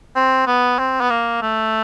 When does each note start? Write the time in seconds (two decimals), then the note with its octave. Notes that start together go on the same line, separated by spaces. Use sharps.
0.16 C4
0.47 B3
0.79 C4
1.01 B3
1.10 A#3
1.42 A3